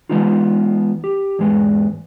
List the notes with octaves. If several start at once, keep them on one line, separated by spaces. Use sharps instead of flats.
E3 G#3 B3 D#4 F4
G4
E2 G#2 G#3 B4